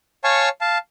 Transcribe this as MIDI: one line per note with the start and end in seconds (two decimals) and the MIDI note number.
0.24 0.49 73
0.24 0.49 77
0.24 0.49 80
0.24 0.49 81
0.24 0.49 85
0.61 0.78 77
0.61 0.78 81